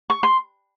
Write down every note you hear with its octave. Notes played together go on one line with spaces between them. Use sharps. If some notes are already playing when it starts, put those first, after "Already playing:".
C#6
C6